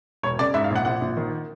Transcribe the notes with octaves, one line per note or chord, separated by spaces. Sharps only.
E1 C#5
C#3 D5
G#2 E5
F5
A#1 F#5
A#1 F#5
A#1
D#3